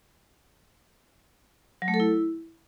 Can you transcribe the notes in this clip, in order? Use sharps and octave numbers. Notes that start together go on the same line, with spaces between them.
F#3
A3
A4
E4